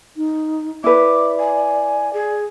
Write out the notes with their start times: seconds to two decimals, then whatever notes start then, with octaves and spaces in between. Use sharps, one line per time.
0.17 D#4
0.84 E4 B4 D5 D6
1.39 G#5
2.13 G#4